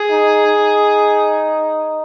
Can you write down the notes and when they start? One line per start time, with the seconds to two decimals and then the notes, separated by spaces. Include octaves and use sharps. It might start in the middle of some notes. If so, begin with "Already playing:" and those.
Already playing: G#4
0.10 D#4
0.47 D#4